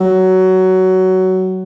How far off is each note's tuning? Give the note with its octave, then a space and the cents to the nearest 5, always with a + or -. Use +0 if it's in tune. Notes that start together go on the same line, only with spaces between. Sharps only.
F#3 +15